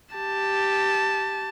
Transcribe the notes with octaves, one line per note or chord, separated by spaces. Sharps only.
G4 A5